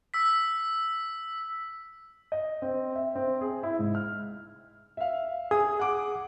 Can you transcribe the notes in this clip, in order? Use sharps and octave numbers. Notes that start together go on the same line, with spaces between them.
E6 B6
D#5
C4
E5
C4
G#4
E4
G#2
F6
E5 F5
G#4 D#6
F#5 D6